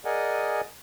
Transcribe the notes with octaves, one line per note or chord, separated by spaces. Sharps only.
G#4 A#4 D5 D#5 F#5 G#5